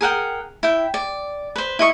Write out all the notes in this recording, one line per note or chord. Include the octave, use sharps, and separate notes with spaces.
G#4 A#4 F#5 G5
E4 G5
D5
B4 C5
E4 D#5 C#6